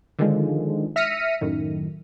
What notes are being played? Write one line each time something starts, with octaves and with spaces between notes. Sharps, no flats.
D3 D#3 F3 G#3
E5 F6 A#6 B6 C#7 D#7
F#2 A2 D#3